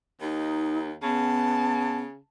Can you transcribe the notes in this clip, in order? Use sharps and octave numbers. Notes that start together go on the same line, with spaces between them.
D#2 D#4
C#3 B3 A5